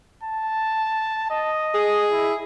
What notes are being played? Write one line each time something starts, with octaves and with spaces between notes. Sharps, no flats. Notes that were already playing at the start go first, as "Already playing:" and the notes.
A5
D#5
G#4
E4